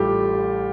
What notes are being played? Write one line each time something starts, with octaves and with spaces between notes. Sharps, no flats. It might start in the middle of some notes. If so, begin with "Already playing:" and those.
Already playing: A1 A2 G3 F4 G4 A4